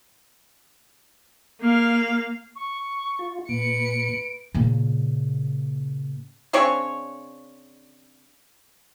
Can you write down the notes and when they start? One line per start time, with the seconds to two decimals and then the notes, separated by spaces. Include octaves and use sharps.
1.61 A#3 F5
2.56 C#6
3.19 F4
3.49 A#2 B4 C#7 D7
4.54 A#2 C#3
6.53 C#3 C4 D4 C#5